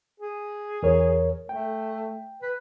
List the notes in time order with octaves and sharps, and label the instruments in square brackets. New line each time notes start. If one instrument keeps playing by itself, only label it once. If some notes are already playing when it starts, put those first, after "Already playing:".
[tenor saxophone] G#4
[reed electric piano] E2 A#4 C#5
[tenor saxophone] A3 [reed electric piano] G5
[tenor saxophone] B4